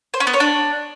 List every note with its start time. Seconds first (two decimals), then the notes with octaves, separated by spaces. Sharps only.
0.14 C5
0.20 C#4
0.27 B3
0.33 C#5
0.40 D4